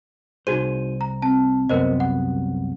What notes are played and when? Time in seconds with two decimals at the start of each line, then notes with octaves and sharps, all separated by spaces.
0.47 C2 D#4 F#4 G#4 C5 D#7
1.01 A#5
1.22 C4 A5
1.69 C2 F#2 B3 A#4 C5 D#5
2.00 F#5